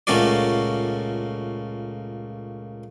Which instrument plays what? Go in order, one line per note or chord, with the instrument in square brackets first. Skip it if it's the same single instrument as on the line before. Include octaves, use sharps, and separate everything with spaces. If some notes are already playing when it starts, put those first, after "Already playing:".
[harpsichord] C#2 A#2 A3 C#4 F#4 D5